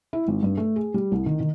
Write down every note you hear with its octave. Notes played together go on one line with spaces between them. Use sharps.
E4
G#1
G2
A3
G#4
G3
C2
D#3
D#3